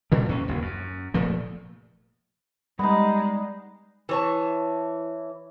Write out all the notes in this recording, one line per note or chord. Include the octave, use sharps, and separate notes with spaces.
G2 A#2 D3 G3
E2 A#2 C#4
F#1 D#2
F#2
F1 A#2 F3 A3
G3 G#3 B3 D#4
E3 C#5 A5